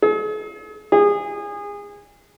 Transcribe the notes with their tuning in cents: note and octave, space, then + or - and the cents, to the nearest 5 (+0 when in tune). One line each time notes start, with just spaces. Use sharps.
G#4 +45
G#4 -25